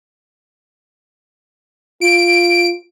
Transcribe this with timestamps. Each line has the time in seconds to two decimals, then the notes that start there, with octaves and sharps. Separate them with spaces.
2.01 F4 D7